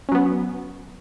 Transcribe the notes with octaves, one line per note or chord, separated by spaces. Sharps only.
F#3 B3 C#4